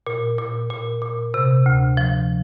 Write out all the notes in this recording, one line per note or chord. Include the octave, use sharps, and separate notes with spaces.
A#2
A#2
A#2
A#2
C3
D2
F3